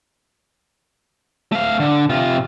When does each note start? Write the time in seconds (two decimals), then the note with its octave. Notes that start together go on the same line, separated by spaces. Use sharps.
1.52 A3 F5
1.80 D3
2.10 C3 F4